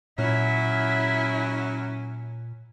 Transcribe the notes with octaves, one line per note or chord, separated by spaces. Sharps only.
A#2 F#3 C#4 E4